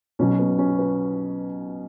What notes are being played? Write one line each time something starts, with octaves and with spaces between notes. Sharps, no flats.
B1 B2 F#3 C#4
B3
C#4
B4